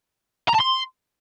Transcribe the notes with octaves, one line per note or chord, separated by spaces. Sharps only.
A#5
A5
C6